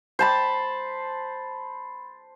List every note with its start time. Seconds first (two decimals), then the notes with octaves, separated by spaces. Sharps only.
0.19 C5 A5 B5